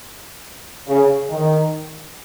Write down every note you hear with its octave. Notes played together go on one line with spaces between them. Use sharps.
C#3
D#3